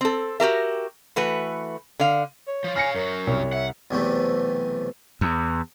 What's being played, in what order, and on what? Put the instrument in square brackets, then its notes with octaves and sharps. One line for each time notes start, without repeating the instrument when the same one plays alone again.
[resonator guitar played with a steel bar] C4 A4
F#4 G4 A#4 E5
E3 A3 F#4 B4
D3 F5
[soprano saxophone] C#5
[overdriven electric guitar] F3 F4
[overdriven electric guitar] F5 B5 [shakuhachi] G#5 [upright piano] F6 A#6 C#7
[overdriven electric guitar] F#2 F#3 [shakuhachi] A#4
[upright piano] C2 [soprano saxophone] C#5
[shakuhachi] E5 [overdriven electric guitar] F#5
[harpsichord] B1 E2 C3 A3
[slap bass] E2